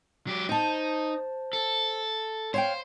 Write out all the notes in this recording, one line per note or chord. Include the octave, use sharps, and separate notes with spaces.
F#3 G4
D#4 C5 A5
A4
C5 C#5 F5 G5